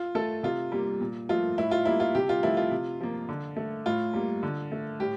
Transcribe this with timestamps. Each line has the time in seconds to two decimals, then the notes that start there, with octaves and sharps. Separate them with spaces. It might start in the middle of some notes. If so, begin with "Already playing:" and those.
Already playing: F4
0.15 A3 A4
0.43 C3 F4
0.72 G3 A#3
1.01 A#2
1.29 F3 A3 F4
1.58 A2 E4
1.71 F4
1.85 G3 A#3 E4
2.00 F4
2.15 C3 G4
2.29 F4
2.43 F3 A3 E4
2.57 F4
2.71 C3
3.00 F3 A#3
3.29 D3
3.57 A3
3.86 A2 F4
4.14 G3 A#3
4.43 D3
4.72 A3
5.00 A2 G4